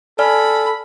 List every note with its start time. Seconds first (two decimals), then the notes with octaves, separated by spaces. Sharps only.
0.19 A4 D5 G#5 B5 F6